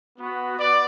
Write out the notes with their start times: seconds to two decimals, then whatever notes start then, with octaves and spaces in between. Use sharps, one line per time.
0.18 B3 F#4
0.57 B3 D5